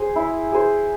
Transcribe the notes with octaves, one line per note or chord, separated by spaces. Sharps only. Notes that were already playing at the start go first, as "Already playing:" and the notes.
Already playing: G#4 C5
E4
G#4 C5